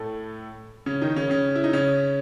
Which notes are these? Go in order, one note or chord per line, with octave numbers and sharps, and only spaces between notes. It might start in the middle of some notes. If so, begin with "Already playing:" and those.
Already playing: A2 A3
C#3 C#4
D#3 D#4
C#3 C#4
C#3 C#4
E4
D#4
C#3 C#4